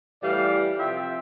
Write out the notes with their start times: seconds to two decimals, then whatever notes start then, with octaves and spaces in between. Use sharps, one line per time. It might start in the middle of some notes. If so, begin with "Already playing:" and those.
0.22 A2 E3 G3 D5 F5
0.77 C3 F3 E5 G5